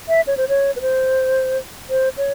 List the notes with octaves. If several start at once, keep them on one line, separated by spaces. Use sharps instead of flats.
E5
C#5
C5
C#5
B4
C5
C5
C#5